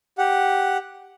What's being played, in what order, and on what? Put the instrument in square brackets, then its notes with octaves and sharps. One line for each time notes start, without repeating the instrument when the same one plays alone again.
[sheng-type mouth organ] G4 F#5